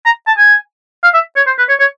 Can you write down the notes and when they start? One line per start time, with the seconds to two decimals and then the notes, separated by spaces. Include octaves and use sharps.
0.05 A#5
0.27 A5
0.38 G#5
1.04 F5
1.14 E5
1.36 C#5
1.47 C5
1.58 B4
1.69 C#5
1.80 C#5